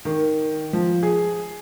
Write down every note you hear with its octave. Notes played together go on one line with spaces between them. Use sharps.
D#3
F3
G#4